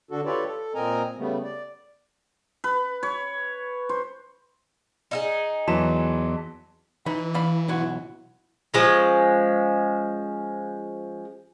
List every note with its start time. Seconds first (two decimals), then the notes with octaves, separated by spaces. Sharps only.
0.11 D3 D4 F#4 A4
0.25 F4 G4 A4 B4 C#5 D5
0.46 A4
0.75 A#2 C4 A#4 D#5 G#5 A#5
1.17 C#3 G3 A3 B3
1.44 D5
2.64 B4
3.03 C#5
3.89 C5
5.11 D#4 E4 G#4
5.68 E2 E3 F#3 A5 C6 B6 E7
7.06 E3 D#4 B5
7.34 D5 F5 B5
7.68 B1 E4 F#4
8.74 F3 G#3 C#4